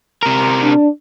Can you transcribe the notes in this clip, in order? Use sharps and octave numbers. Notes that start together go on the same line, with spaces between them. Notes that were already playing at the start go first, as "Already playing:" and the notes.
C3 A#4
D4